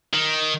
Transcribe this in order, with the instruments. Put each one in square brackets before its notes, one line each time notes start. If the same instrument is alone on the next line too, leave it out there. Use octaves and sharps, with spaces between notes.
[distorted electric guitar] D#3